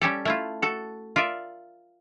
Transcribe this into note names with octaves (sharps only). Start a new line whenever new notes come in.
G3 C#4 G4 A4
A3 E4 F4
F#4 A4
F4 A#4 D5 E5